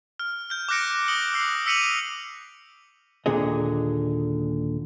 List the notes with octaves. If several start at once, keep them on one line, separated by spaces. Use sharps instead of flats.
F6
F6 G6
D6 F6 F#6 A#6 C#7 D7
D#6 C#7 F#7 G7
E6 F#6 C7 F7
E6 B6 C#7 D#7 F7 F#7
D#2 A#2 D3 G#4 D#5